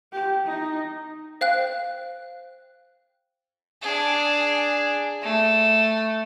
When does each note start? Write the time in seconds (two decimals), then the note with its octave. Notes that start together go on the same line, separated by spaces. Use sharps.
0.13 G4
0.45 D#4
1.41 C5 F5 G5 F#6
3.82 D4 G#4
5.22 A3